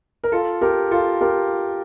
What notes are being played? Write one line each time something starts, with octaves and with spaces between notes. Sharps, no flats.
A#4
F4 A4
G4 A#4
F4 A4
G4 A#4